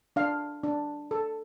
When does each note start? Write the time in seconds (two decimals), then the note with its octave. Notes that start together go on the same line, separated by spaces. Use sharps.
0.16 D4 F5
0.63 D4
1.11 A4